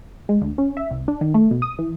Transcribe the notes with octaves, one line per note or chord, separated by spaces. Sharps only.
G#3
D2
C#4
E5
C2
D4
D#3
A3
B2
D#6
E3